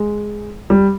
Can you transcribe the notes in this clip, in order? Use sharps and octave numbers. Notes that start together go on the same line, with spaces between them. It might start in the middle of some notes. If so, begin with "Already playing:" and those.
Already playing: G#3
G3